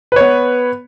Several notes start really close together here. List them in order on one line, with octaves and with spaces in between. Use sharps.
B4 C#5 B3